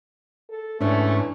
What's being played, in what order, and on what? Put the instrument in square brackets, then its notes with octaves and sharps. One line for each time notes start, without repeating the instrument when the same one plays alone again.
[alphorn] A4
[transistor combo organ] G#2 C#4 [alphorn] E3 [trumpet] A3 [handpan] D4 C#5